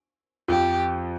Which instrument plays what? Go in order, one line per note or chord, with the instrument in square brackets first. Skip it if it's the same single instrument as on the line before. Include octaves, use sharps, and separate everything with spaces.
[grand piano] F2 F3 [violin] G4